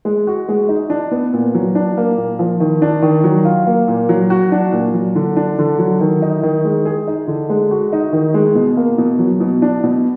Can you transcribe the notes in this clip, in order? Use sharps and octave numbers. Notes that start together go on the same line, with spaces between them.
G#3
F#4
G#3
D#4
D4
B3
A#2
F#3
D4
A#3
A#2
F3
D#3
D4
D#3
F#3
F4
A#3
A#2
F#3
F#4
D4
A#2
F#3
D3
D4
D3
F#3
D#3
D#4
D#3
G#3
G#4
D#4
D3
G#3
F#4
D#4
D#3
G#3
B2
A#3
B2
F#3
B2
D4
B2